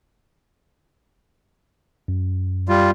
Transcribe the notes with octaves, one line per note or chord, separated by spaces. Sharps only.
F#2
G3 F4